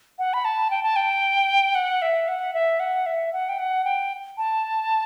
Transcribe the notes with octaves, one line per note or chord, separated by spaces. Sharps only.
F#5
B5
A5
G5
A5
G5
F#5
E5
F#5
E5
F#5
E5
F#5
G5
F#5
G5
A5